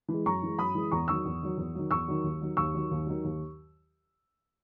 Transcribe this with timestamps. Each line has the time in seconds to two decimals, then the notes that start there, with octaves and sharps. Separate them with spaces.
0.08 E3 G#3
0.26 F#2 A#5 C#6
0.42 E3 G#3
0.59 F#2 B5 D#6
0.75 E3 G#3
0.91 E2 A#5 C#6
1.08 D#3 F#3 C#6 E6
1.25 E2
1.42 D#3 F#3
1.57 E2
1.75 D#3 F#3
1.91 E2 C#6 E6
2.08 D#3 F#3
2.24 D#2
2.41 D#3 F#3
2.57 D#2 C#6 E6
2.74 D#3 F#3
2.91 D#2
3.07 D#3 F#3
3.24 D#2